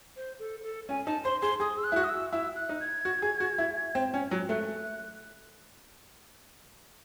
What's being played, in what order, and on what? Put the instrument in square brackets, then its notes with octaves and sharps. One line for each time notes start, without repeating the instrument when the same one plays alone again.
[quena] C5
A4
A4
[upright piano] C#4 [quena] G#5
[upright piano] D#4 [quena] A5
[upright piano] C5 [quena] C6
[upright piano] G#4 [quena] C6
[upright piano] G#4 [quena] D#6
[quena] E6
F#6
[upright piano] E4
F#4
[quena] D#6
E6
[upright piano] E4 [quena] E6
[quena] F#6
[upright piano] D#4
[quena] G#6
[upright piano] F#4
G#4
F#4
E4
C4
C#4
F#3
[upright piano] A3 [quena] F#6